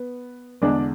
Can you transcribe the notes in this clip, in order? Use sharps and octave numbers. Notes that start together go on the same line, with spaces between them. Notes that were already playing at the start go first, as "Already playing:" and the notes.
Already playing: B3
E2 D3 G#3 D4 D5